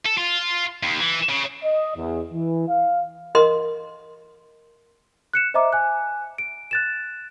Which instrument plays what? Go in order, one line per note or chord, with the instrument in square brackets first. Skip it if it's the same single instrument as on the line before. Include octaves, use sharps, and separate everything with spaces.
[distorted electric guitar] A4
F4
D#2
E3
C#3
[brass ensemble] D#5
E2
E3
F5
[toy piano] A#4 D#5 C6
[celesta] F#6 C#7 E7
C5 D#5 E5 A#5 D6
G#5 F#6
D7
F#6 A6 E7